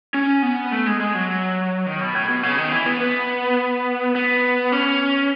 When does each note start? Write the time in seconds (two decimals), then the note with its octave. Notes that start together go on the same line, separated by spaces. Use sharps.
0.14 C#4
0.43 B3
0.72 A3
0.86 G#3
1.00 G#3
1.15 F#3
1.86 D#3
2.00 B2
2.15 A2
2.28 B2
2.43 C#3
2.58 D#3
2.72 E3
2.86 B3
3.00 B3
4.15 B3
4.72 C#4